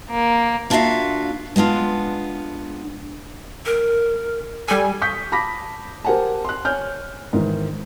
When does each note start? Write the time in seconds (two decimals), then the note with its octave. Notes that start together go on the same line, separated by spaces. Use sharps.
0.10 A#3
0.70 A#3 D4 F4 F#4 E5 F5
1.56 G#3 B3 D4 F4
3.66 A#4
4.68 G3 A4 G#5
5.02 C#6 D#6 G6 B6
5.32 A5 B5 D6 A#6 B6
6.05 G4 A#4 C5 F#5 G#5 A5
6.45 C6 F#6
6.65 C#5 G#5 F6 G6
7.33 G#2 D#3 E3